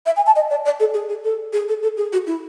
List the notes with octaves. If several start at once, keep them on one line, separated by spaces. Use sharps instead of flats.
E5
G#5
A5
D#5
D5
D5
A4
G#4
G#4
A4
G#4
A4
A4
G#4
F#4
E4